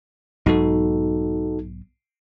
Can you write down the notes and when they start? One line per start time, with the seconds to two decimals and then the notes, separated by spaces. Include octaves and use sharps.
0.46 B1 G#2 B2 D#4 F#4 A4